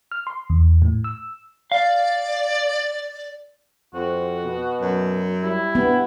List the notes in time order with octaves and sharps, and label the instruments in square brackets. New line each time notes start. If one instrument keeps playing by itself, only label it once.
[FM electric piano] F6
C6
E2
A2
E6
[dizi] D5 [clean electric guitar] F5
[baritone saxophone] F2 [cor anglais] F#4 [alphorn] C5
[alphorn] B2
[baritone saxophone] F#2
[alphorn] G3 [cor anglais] E4
[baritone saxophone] G2 [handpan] B3